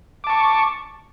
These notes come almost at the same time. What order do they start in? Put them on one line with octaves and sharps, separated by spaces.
D6 A5 C#6